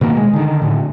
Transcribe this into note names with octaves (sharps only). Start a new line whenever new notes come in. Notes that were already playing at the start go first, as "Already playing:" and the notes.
B2 D#3 A#3
G#3
D3 D#3
A2 D3